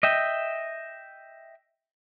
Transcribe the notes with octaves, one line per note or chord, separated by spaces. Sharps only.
D#5 E5 G5